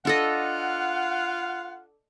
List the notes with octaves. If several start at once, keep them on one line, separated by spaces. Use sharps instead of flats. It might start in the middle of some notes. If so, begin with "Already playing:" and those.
D4 F4 A4 D#5 F5 F#5